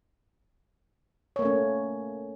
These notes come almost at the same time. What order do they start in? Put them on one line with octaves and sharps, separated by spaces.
C#5 A#3 A3 C#4